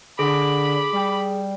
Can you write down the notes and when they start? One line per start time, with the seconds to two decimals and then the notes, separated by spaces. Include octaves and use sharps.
0.19 D3 G#4 B5 D6
0.93 G3